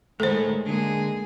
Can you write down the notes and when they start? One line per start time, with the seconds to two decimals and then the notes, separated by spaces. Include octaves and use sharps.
0.20 D#3 G#3 A3 A4 C5 C#5
0.66 D3 G#3 A#3 G#4